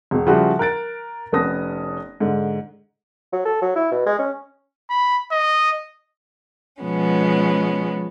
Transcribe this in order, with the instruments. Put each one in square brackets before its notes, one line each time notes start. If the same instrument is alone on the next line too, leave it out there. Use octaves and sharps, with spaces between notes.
[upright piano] E1 B2
C#3 F3 G3 E4 F#4
A#4 F#6 A6 D7
F1 B3 C#4 A5 D#6 A#6
G#2 D3
[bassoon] F#3
A4
F#3
E4
B2
G#3
C#4
[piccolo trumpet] B5
D#5
[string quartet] B2 F3 G#3 B3 C#4